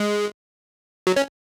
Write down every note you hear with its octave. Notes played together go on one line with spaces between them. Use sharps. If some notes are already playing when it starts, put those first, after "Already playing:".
Already playing: G#3
F#3
C#4